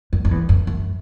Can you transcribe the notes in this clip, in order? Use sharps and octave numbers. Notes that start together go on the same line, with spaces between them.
F#2
F#2
E2
F#2
F#2